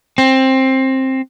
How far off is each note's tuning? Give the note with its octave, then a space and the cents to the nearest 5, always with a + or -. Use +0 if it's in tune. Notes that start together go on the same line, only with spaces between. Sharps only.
C4 +15